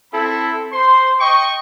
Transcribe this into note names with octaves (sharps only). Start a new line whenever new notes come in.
C4 E4 A4 B5
C5 C6
D#5 G5 C#6